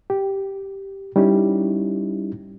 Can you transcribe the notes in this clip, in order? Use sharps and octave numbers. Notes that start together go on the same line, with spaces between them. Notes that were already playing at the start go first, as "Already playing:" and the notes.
G4
G3 C#4 D#4 E4 G4